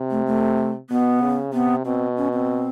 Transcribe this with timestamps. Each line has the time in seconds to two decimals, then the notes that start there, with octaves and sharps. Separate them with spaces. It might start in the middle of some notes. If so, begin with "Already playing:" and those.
Already playing: C3
0.11 A3
0.26 A3
0.90 B2 B3
1.21 C#3
1.53 C3 B3
1.85 B2 C4
2.17 C#4
2.33 C4